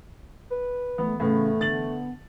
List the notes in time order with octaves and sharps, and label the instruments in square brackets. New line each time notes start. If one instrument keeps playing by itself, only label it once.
[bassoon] B4
[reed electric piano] E3 [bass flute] A3 [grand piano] B3
[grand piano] A2 B3 [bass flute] C#3 [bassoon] A3
[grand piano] D3 A6 F#7 [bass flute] B3